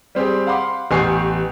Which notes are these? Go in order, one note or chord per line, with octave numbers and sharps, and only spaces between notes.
G3 C4 G4 G#4
F5 F#5 B5 C6 D6
A1 B3 G4 G#5 C#6 C7